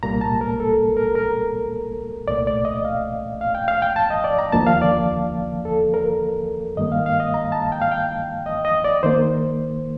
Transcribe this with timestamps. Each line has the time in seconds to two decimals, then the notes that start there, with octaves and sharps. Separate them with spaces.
0.03 C2 A#2 G3 A#3 A#5
0.21 A5
0.41 A#4
0.60 A4
0.97 A#4
1.15 A#4
2.28 C2 A#2 A3 D5
2.47 D5
2.65 D#5
2.85 F5
3.41 F5
3.55 G5
3.68 F5
3.82 G5
3.96 A5
4.10 D#5
4.24 D5
4.39 A#5
4.52 D#2 D3 F3 A#3 A5
4.66 F5
4.82 D5
5.65 A4
5.94 A#4
6.77 G2 D#3 G3 A#3 D#5
6.92 F5
7.06 F5
7.20 D#5
7.34 A#5
7.52 A5
7.72 G5
7.82 F5
7.92 G5
8.46 D#5
8.65 D#5
8.84 D5
9.03 D#3 A#3 C5